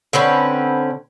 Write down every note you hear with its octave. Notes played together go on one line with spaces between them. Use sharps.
D3 C4 C#4 B4